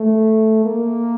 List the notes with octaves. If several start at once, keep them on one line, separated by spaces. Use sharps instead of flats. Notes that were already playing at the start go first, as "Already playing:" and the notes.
Already playing: A3
A#3